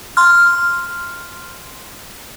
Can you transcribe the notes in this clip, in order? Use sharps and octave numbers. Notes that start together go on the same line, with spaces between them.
C6 F6